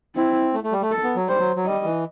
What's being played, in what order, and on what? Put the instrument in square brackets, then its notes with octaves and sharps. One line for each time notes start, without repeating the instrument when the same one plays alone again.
[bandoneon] C4 [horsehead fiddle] E4
[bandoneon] A3
A3
G3
A3
[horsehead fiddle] A4
[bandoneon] B3
F#3
[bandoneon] G3 [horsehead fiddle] C5
[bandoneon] F#3
F#3
[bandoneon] G3 [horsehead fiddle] D#5
[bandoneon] E3